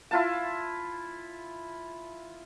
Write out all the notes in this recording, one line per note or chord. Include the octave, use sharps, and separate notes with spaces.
E4 F4 A5